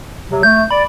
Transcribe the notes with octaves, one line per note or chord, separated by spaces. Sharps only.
C3 F#3
A3 G6
D5 B5